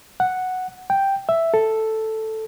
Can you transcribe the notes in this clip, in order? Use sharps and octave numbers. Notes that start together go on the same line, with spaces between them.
F#5
G5
E5
A4